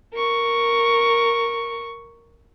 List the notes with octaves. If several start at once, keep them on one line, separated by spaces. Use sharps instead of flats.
A#4 C#6